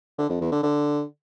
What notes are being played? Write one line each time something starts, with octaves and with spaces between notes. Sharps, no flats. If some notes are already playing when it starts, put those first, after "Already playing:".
D3
F2
E2
D3
D3